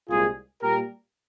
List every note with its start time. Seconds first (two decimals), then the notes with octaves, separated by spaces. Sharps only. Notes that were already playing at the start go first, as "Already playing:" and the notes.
0.09 C2 A#2 G#3 F4 G#4
0.62 A#2 G3 A#3 G4 A#4